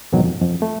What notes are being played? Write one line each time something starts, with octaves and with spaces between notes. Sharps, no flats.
E2 G#2 B2 D#3 F#3
F2
F2
A3